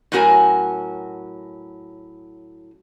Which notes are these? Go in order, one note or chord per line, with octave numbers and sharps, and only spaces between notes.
A2 F#3 C#4 F#4 A#4 G#5